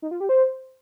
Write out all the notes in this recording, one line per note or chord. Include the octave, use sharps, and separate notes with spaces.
D#4
F4
G4
C5